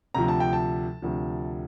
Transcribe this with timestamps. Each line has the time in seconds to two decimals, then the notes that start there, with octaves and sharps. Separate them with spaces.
0.14 D2 C3 F3 A#5
0.28 A5
0.40 G5
0.53 A5
1.02 D2 C3 F3